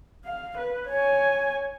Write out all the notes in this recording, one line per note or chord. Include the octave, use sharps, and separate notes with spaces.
F5
B4
C#5 G#5